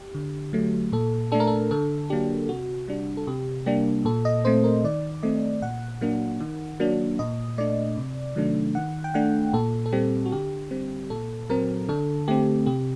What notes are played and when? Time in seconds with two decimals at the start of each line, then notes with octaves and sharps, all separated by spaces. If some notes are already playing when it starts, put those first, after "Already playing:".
Already playing: G4
0.15 D3
0.53 F#3 A3
0.92 A#2 A4
1.32 A3 D4 A4
1.40 A#4
1.47 A4
1.71 D3 A4
2.10 F#3 A#3 D4 G4
2.49 C3 F#4
2.88 G3 D4
3.17 A4
3.27 C3 G4
3.66 G3 A#3 D4 G4
4.05 A#2 A4
4.25 D#5
4.45 A3 C4 C5
4.64 A#4
4.84 D#3 D5
5.23 A3 C4 D#5
5.62 A#2 F#5
6.01 F#3 A#3 D4
6.40 D#3
6.80 F#3 A#3 D4
7.19 A#2 D#5
7.58 A3 D4 D5
7.97 C3
8.36 D#3 F#3 A3 D4
8.75 D#3 F#5
9.04 G5
9.14 A3 D4 F#5
9.53 A#2 A4
9.86 A4
9.93 G3 C4 G4
10.25 F#4
10.32 D3 G4
10.71 G3 C4
11.10 A#2 A4
11.49 F#3 C4 A#4
11.89 D3 A4
12.28 A3 C4 G4
12.66 C3 G4